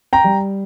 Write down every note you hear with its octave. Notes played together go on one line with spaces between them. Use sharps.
G5 A#5
G3